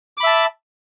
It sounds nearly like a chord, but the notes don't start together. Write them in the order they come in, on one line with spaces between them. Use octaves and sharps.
D6 B5 E5 A5